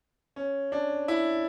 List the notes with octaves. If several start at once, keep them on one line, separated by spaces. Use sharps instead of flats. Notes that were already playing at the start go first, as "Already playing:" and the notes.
C#4
D4
E4